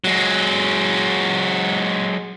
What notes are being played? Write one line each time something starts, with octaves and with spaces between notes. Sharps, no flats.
F#3 G#3